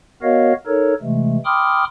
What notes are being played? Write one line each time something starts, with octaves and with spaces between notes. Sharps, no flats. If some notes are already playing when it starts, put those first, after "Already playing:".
B3 F#4 A#4 C#5 D#5 F5
D#4 A4 A#4 C#5
C3 E3 G#3 A3
G5 B5 C6 D6 D#6 F6